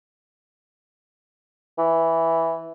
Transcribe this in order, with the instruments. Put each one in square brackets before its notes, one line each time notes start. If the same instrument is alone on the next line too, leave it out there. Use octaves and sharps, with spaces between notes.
[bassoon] E3